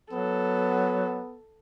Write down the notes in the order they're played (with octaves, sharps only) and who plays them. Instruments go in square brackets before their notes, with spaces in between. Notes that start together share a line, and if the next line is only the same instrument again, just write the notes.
[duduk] F#3 [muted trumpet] B3 [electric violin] A4